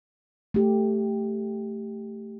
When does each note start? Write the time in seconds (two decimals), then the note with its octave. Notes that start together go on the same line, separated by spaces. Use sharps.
0.54 A3 G4